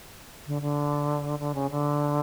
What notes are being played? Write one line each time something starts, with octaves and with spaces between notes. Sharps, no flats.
D3
D3
D3
C#3
D3